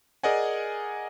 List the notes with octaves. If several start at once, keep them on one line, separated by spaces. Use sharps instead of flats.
G#4 A#4 D5 D#5 F#5 G#5